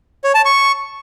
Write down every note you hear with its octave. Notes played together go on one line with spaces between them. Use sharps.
C#5
A5
C#6